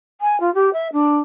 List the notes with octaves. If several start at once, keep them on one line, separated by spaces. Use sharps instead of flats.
G#5
F4
G4
E5
D4